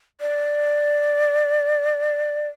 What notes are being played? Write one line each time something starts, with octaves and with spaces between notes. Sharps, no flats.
D5